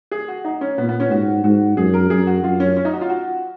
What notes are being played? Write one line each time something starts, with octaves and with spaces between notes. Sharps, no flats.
G#4
F#4
D#4
C#4
A#2 B3
B3
C#4
G#2 F#4
G#2 F#4
F#2 G#4
A#4
F#2 G#4
F#4
F#2 F4
C#4
C#4
D#4
F#4
F4
F#4